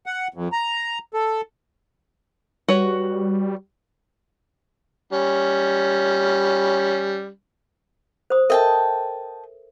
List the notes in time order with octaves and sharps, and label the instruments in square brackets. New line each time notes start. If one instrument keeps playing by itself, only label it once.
[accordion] F#5
F2
A#5
A4
[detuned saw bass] G3 [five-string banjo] F#4 B4 C#5
[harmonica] G3 C#4
[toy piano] C5 D#6
[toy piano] A4 A#4 E5 [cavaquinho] D#5 G5 A5